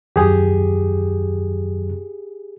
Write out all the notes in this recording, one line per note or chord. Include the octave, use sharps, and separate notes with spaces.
F#2 D#3 F#3 G4 G#4